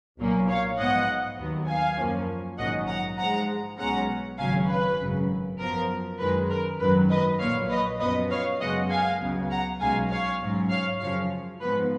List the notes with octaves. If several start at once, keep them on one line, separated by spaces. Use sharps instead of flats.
B1 A#2 F#3 A#3 C#4
C#5 F5
G#2 F3 B3 D#5 F#5
D#2 D#3 F#3 B3
F5 G#5
F#2 F3 A#3 C#4
A#1 G#2 D#3 F#3 C#4 D#5 F#5
F#5 A#5
G#2 F3 G#3 F#5 A#5
B1 B2 G#3 C#4 F#5 A#5
G#1 F#2 C#3 F#3 C#4 F5 G#5
B4
G#1 F#2 C#3
F#2 F3 B3 A#4
F#2 D#3 G#3 B4
A#4
G#1 F#2 D#3 F#3 B4
B4 D#5
A#1 A#2 F#3 C#5 F5
B4 D#5
F#2 F3 B3 B4 D#5
C#5 F5
F#2 C#3 G#3 B3 D#5 F#5
F5 G#5
C#2 C#3 F#3 B3
F#5 A#5
B1 B2 G#3 C#4 F5 G#5
C#5 F5
G#2 F#3 C#4
C#5 F5
F#2 C#3 F3 C#5 F5
G#2 F3 B3 B4